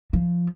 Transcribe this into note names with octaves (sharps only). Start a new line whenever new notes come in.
F3